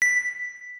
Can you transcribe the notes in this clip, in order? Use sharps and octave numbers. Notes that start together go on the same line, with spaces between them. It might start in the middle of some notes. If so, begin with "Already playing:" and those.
B6